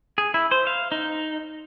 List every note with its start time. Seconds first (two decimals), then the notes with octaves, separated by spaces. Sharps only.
0.18 G#4
0.34 E4
0.51 C5
0.67 F5
0.92 D#4